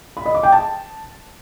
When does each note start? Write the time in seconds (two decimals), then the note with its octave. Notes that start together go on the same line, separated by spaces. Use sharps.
0.17 B5
0.26 D#5
0.34 D6
0.43 G5
0.52 A5